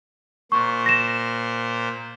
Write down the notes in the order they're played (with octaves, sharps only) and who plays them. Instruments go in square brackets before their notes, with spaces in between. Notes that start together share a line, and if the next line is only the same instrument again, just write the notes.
[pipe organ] A#2 C5 [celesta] C#6
[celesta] A#6 E7